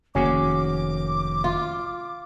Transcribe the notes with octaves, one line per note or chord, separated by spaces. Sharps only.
F1 D#3 A#3 C#4 F#4 G#4 D6
F4